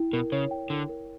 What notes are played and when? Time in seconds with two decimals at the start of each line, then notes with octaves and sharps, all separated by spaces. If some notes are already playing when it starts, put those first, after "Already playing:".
Already playing: E4 G5
0.13 B2 A#4
0.32 C#3 C#5
0.51 G5
0.70 D3 E4
0.89 A#4